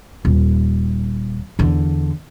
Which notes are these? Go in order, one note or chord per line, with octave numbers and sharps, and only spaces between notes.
D#1
E2 D3